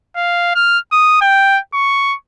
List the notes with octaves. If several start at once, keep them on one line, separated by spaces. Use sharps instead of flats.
F5
F6
D#6
G5
C#6